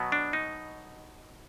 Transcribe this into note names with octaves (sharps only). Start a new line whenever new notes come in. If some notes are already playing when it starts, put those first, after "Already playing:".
Already playing: B2 F#3 B3
D4
D#4